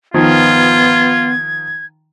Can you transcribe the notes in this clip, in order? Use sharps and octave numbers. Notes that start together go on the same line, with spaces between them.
D#3 F3 B3 F4 G#6